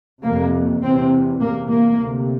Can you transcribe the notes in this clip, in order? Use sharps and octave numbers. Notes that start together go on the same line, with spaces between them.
F2 C3 A#3
E2 C3 C4
E2 C3 A#3
A#3
D2 C3